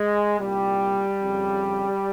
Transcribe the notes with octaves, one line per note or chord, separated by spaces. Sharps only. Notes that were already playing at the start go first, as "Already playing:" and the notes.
Already playing: G#3
C2 A#2 G3
F2 C#3